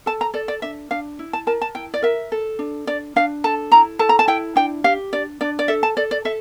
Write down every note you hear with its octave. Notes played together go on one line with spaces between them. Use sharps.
A4 A5
A#5
A4 D5
D5
D4 E5
D4 F5
E4
A5
A#4 A5
A5
E4 G5
D5
A#4 E5
A4
D4
D4 D5
D4 F5
A4 A5
E4 A#5
A4 A5
A#5
A5
E4 G5
D4 G5
G4 F5
D4 D5
D4 D5
D5
A4 E5
A5
A4 D5
D5
A4 E5